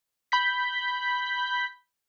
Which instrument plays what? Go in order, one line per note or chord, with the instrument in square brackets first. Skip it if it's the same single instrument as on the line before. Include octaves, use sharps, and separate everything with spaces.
[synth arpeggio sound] B5 G6 B6